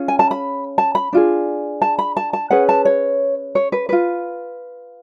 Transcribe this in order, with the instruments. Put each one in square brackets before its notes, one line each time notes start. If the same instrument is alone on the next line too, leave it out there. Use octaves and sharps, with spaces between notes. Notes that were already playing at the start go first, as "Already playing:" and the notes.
Already playing: [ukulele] C#4 F4 G#4
G#5
A5
B5
A5
B5
D4 F4 G#4
A5
B5
A5
A5
C#4 G#4 B4 F#5
A5
C#5
C#5
B4
F4 B4